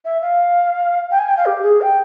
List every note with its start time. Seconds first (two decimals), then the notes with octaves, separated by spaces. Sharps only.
0.05 E5
0.21 F5
1.11 G5
1.19 G#5
1.28 G5
1.37 F5
1.46 G4
1.62 G#4
1.81 G5